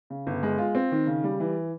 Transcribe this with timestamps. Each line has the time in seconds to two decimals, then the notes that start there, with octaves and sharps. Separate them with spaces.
0.10 C#3
0.27 G1
0.43 G#3
0.58 F4
0.75 C4
0.92 D#3
1.07 C#3
1.24 G3
1.40 E3